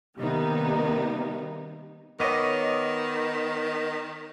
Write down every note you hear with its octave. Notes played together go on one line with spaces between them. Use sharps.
C3 D#3 G3 A#3 B3 D#4
D#3 B3 C#5 D#5 C#6 D6